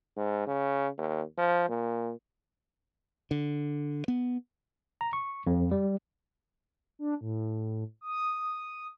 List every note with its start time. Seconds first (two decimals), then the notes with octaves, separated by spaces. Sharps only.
0.17 G#2
0.46 C#3
0.98 D#2
1.38 F3
1.68 A#2
3.31 D3
4.08 B3
5.01 A#5
5.13 C#6
5.47 F2
5.71 G3
6.99 D4
7.21 A2
8.01 D#6